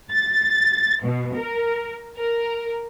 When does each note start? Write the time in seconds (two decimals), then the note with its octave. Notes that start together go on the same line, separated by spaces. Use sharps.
0.11 A6
1.03 B2
1.35 A#4
2.17 A#4